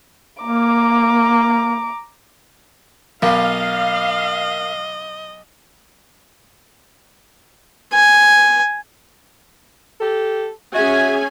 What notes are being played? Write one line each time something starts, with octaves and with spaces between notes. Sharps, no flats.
A#3 A#5 D6
B1 A#3 D#5 F5
G#5
G4 A4
C#4 F#4 G#4 E5 G#5